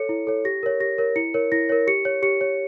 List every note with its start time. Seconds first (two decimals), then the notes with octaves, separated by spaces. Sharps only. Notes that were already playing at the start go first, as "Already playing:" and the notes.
Already playing: A4 C#5 C#7
0.09 E4
0.27 A4 C#5
0.45 G4 A#6
0.63 A#4 C#5
0.80 G4 A#6
0.98 A#4 C#5
1.16 E4 C#7
1.34 A#4 C#5
1.52 E4 A#6
1.69 A#4 C#5
1.87 G4 C#7
2.05 C#5
2.23 G4 C#7
2.41 C#5